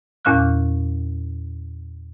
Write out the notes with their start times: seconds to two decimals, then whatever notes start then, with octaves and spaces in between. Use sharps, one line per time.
0.25 E2 A#2 C#4 F5 F6 F#6